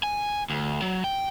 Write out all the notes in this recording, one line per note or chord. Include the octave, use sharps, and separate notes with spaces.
G#5
D2
F#3
G5